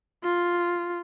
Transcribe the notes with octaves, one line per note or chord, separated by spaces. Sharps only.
F4